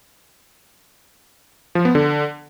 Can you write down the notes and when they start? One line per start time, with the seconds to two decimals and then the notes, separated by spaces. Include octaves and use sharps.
1.75 F3
1.85 B3
1.95 D3